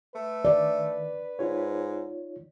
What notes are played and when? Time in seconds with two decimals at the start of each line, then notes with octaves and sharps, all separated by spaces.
0.15 A3 B4
0.45 D#3 D5
1.39 G#2 D#4 F4 C#5